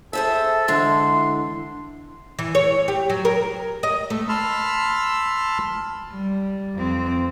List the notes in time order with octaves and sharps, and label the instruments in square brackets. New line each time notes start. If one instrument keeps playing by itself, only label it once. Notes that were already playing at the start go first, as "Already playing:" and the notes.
[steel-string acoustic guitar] G#4 C5 E5 [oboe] A4
[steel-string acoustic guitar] D3 E3 G#3 [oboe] C6
[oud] E3
C#5
G4
F#3
A#4
D#5
A3
[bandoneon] A5 B5 C6 E6 F6
[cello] G3
F2 C4